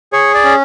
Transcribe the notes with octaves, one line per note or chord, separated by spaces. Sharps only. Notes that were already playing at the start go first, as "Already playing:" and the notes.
G#4 C#5
D5
C#4